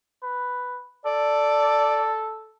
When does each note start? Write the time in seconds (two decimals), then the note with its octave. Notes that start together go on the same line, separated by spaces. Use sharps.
0.23 B4
1.05 A4 D5